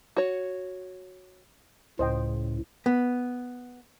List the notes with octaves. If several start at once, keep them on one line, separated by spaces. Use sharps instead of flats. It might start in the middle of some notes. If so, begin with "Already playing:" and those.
F#4 C#5
C#2 A2 C5 D#5 G5
B3